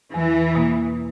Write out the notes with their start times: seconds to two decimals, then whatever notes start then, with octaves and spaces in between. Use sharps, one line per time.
0.14 E2 E3
0.55 B2 A#3